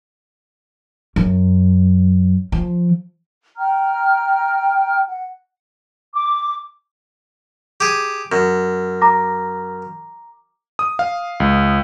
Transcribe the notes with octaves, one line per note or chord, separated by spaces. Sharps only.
F#2
F3
G5 A#5 F6
F#5
D6
G4 G#4
F#2
A#5 D6 A#6
D#6
F5
C#2